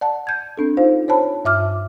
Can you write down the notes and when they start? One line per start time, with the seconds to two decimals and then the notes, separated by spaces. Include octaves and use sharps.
0.01 D5 F#5 A5
0.27 G6 G#6
0.58 C4 D4 A4
0.77 D#4 F4 C5 F5
1.08 C5 C#5 A5 B5
1.45 G2 E5 D6 F6